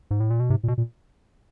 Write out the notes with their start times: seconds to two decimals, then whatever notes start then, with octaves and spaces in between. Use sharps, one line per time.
0.11 G#2
0.20 A2
0.30 A#2
0.40 B2
0.50 G#2 C3
0.63 A#2
0.68 B2
0.78 A#2